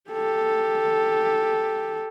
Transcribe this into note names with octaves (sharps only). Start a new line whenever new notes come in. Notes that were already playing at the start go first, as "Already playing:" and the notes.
G4 A4